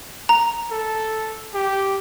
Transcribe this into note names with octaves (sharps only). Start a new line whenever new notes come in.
A#5
A4
G4